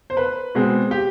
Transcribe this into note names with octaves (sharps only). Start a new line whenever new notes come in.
C5
B4
B2 G#3 C4
G4